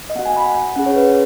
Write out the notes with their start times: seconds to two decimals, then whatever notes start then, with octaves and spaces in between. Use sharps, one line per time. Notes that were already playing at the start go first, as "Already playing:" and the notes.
0.10 D#5
0.15 B3 F#4 F#5
0.26 G#5
0.36 B5
0.46 F#5
0.76 C#4 G#4 F#5
0.86 C#5
0.96 B4